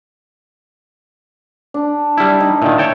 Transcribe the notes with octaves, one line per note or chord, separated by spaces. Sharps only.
D4
G3 E4
D#4
A#2 D#3 E4
C#5 G5 A5